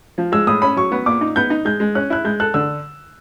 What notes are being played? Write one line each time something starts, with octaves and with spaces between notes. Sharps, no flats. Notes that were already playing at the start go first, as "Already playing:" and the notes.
F3
G#3 E6
A2 D#6
C#4 B5
F#3 C#6
B3
A#2 D6
D#4
B3 G6
D#4
G#3 G6
G#3
C#4 F#6
E4 F#6
G#3 G6
A4 F#6
D3 E6